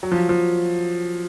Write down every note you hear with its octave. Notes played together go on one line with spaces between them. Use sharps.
F#3
F3
F3